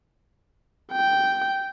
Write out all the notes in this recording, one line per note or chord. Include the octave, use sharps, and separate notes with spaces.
G5